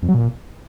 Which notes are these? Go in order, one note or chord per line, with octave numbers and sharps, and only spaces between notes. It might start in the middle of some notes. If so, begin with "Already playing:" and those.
F2
F#3
A#2